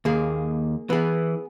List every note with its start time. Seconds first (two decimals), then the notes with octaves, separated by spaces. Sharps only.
0.05 D#2 A#3 G#4
0.90 E3 B3 G#4